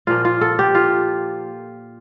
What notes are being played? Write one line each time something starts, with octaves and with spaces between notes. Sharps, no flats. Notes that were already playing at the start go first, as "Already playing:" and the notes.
A#2 F3 A#3 F4
F4
A4
G4
F4